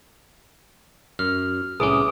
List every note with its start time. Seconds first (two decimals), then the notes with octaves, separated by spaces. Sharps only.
1.19 F#2 F6
1.80 C2 A2 E3 C#4 G#4 B4 D6 D#6